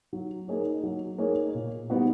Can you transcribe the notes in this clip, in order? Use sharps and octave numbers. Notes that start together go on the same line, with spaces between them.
F#3
A#3 D#4 G#4 C#5
F#3
A#3 D#4 G#4 C#5
A#2
G3 B3 D#4 F#4